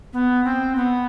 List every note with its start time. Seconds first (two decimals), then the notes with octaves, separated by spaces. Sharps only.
0.13 B3
0.45 C4
0.76 B3